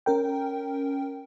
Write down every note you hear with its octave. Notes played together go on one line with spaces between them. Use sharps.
C#4 A#4 G5